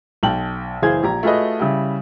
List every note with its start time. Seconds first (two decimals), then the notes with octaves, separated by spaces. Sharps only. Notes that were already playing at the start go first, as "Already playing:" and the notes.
0.23 B1 G5 A5 F#7
0.82 F#1 E3 G#4 C5 F5 G#6
1.03 A#1 G4 A#5
1.23 A3 F4 F#4 G#4 B4 D#5
1.59 C#3 G3 E4